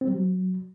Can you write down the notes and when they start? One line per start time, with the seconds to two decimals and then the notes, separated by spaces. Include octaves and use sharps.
0.01 C4
0.07 G3
0.13 F#3